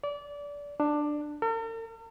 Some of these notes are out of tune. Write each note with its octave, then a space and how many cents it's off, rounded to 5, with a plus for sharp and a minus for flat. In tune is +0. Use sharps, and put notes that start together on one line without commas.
D5 -25
D4 +10
A#4 -45